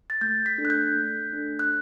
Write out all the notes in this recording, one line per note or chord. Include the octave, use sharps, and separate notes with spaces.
A6
A3 G6
B6
D4 A4
F#6
G6
A3
D4 A4
F#6